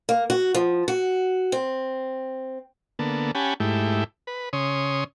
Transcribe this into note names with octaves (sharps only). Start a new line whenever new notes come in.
A#3
F#4
F3
F#4
C4
D3 A#3 B3 A4
C#4 G4 F#5 G#5 A5 B5
G#2 A3 E4 G4
B4
C#3 C#5 C6 D#6